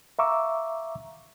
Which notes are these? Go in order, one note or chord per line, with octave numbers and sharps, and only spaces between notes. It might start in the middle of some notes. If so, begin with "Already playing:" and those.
E5 F5 A#5 C#6 D6 E6